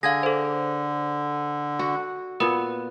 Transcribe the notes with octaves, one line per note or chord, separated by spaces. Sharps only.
D3 G#4 F5 G#6 A#6
A4 C5
F#4
A#2 B3 B4